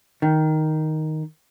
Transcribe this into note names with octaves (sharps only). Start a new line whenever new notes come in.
D#3